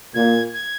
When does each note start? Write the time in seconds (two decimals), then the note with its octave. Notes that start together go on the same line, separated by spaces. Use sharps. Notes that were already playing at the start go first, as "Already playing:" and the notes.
0.14 A#2 G#6
0.54 G#6